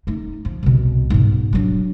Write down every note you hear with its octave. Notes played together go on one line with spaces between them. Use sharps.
A3 D#4
F3
C2 B2
G#2 B2
F#3 D4